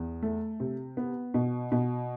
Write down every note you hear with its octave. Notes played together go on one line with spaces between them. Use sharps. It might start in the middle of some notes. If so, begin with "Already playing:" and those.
Already playing: E2
A3
C3
B3
B2
B2